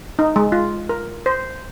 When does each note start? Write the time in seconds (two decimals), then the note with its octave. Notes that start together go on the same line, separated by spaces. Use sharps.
0.19 D#4
0.36 G#3
0.52 F4
0.89 A#4
1.26 C5